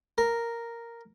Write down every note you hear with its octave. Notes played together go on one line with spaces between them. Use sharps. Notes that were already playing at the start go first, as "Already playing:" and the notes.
A#4